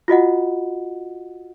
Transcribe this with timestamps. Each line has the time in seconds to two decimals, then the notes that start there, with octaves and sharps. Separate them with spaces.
0.08 F4 F#4 D#5 F#5